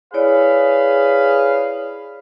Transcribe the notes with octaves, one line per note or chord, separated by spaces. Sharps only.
E4 G#4 B4 C#5 D5 F5